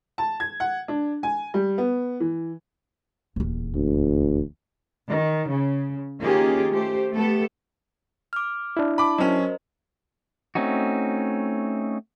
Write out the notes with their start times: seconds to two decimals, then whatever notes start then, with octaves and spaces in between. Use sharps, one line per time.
0.18 A5
0.40 G#6
0.60 F#5
0.88 D4
1.23 G#5
1.54 G3
1.78 B3
2.20 E3
3.36 D#1 E2
3.75 D2
5.08 D#3
5.48 C#3
6.21 D#3 A#3 C#4 F4 G4 G#4
6.73 A3 G4 C5
7.13 A3 B3 G4 A4
8.33 D6 F6
8.77 D4 E4
8.98 A5 B5 D6
9.18 F#3 C#4 A#4 C5 D#5
10.55 A3 C4 C#4 D#4 F#4